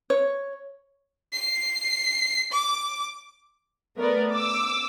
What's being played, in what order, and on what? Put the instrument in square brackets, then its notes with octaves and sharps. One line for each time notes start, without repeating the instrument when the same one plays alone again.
[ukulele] C#5
[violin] C7
D6
[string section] A3 B3 A#4 D5
D6 E6